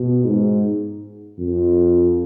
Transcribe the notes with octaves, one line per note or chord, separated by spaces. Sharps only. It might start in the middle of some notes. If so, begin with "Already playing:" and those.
Already playing: B2
G#2
F2